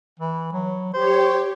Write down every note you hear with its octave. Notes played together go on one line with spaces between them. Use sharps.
E3
F#3
G4 C5 C#5